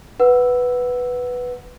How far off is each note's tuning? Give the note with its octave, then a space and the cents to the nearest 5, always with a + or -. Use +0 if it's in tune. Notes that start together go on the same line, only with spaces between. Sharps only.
B4 +0 F#5 +0 E6 +0